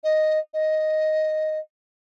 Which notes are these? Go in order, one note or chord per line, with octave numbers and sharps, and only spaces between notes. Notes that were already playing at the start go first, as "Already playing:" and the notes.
D#5
D#5